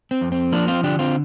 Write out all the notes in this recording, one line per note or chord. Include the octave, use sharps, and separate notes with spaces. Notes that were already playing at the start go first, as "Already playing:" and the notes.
C4
F2
C4
F3 A#3 D4
C4 F4
D3 D4 G4
C4 F4